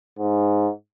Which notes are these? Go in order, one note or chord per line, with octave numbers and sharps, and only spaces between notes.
G#2